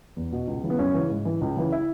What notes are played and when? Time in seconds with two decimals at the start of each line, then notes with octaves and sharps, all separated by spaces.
0.17 E2
0.32 B2
0.47 C#2
0.63 C#3 E3
0.70 B3
0.79 F#2 C#4
0.94 C#3 E3
1.10 G#2
1.25 E3
1.41 C#2
1.57 C#3 E3
1.72 E4